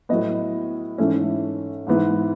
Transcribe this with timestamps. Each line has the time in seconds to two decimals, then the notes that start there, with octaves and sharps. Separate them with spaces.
0.09 A2 F#3 B3 D#5
0.98 G#2 E3 A3 C#4 E5
1.87 G#2 E3 B3